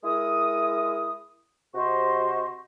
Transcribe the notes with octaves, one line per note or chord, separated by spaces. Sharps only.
G#3 E4 A#4 D#6
C3 F#4 G4 C5 D#5 C#6